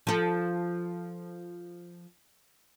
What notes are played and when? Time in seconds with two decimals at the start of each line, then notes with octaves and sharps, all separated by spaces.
0.07 F3 A4